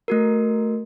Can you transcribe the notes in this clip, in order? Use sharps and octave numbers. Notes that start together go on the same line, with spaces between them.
A3 F#4 A#4